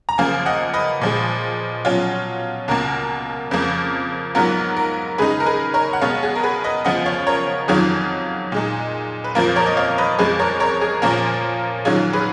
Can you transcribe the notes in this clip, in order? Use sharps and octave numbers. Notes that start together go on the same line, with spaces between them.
A#5
F#2 C#3 F3 A#3 F5 G#5
D#5 F#5
B4 D#5
A#2 F3 G#3
B2 F#3 C#4 F4
C#2 B2 A#3 A#4
F2 C#3 F3 A#3
G#2 F#3 B3 F4 A#4
A#4
C#3 G#3 D#4 G#4 B4
A#4
G#4 B4
A#4 C#5
F#5
B2 G#3 B3 C#5 F5
G#4
A#4
G#4 B4
B4 D#5
F#2 C#3 F3 B3 F4 D#5 F#5
C#5 F5
A#4 C#5
F2 D#3 F#3 C#4 F4 G#4
A#2 G#3 D#4
B4
F2 F3 A#3 F4 A#4
A#4 C#5
D#5
C#5 F5
B4 D#5
F2 F3 G#3 G#4 B4
A#4 C#5
A#4 C#5
G#4
A#2 F3 A#3 C#4 F4 A#4
G#2 D#3 F#3 C#4 F4 G#4
G#4 B4